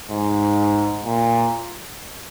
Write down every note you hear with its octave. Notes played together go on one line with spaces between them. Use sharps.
G#2
A#2